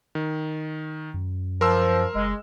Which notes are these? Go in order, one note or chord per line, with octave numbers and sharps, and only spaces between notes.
D#3
F#2
F3 A#4 C6 E6
F#1 G#3